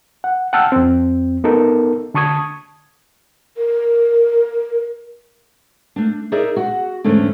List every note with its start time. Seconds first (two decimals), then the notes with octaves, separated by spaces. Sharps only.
0.24 F#5
0.53 F#5 G5 A5 E6 F6
0.72 F2 C4
1.44 B3 D#4 A4 A#4
2.14 D3 A5 C#6 D#6 G#6
3.57 A#4
5.96 A3 D4
6.32 D#4 G#4 A#4 D5 E5
6.56 F#4 F#5
7.04 E2 G#2 D3 A3 C#4 D4